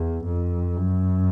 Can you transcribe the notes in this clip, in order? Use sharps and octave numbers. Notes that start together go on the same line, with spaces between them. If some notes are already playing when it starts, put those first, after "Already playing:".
Already playing: E2
F2
F#2